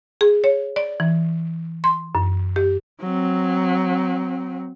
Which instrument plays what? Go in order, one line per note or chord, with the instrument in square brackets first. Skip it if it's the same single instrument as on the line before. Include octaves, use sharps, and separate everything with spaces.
[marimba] G#4
C#5
D5
E3
C6
F#2
G4
[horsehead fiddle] F#3 C4